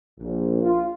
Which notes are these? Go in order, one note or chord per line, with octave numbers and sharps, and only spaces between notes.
A#1
F4